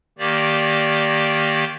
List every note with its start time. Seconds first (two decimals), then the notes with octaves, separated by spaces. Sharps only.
0.18 D#3 A#3 G4 D5